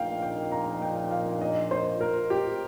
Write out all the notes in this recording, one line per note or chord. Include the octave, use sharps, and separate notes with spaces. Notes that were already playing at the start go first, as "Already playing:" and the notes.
Already playing: A#1 A#2 A#3 D#4 F5 G5
G5
A#5
G5
F5
D#5
C5
A#4
G4